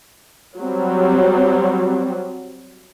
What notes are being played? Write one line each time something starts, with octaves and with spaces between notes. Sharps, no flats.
F#3 G3 C4